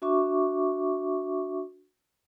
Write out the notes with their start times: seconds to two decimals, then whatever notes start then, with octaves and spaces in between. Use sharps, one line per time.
0.02 D4 F#4 E5 C#6 D6